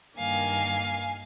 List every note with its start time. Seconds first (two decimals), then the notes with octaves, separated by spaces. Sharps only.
0.17 G2 D#3 A#3 F5 G#5